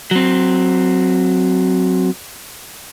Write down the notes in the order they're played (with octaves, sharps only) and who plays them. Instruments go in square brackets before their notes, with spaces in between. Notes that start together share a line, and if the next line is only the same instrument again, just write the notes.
[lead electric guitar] F#3 C4